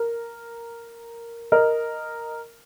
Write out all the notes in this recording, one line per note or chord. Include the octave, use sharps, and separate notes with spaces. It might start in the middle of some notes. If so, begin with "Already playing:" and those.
Already playing: A#4
A#4 D#5